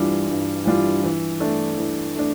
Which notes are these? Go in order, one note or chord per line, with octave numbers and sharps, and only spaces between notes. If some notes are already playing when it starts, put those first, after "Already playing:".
Already playing: G2 E3 G3 D4 F4
G2
E3 G3 D4 F4
E3
A3 D4
E3
A3 D4